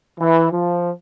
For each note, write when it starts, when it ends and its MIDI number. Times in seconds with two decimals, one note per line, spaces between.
0.19 0.48 52
0.52 0.91 53